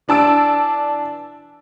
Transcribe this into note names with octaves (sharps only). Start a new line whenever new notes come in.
E3 D4 A5 E6 D7